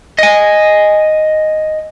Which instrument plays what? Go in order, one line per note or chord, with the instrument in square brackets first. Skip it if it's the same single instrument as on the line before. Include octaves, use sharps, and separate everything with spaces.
[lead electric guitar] D#5 G#5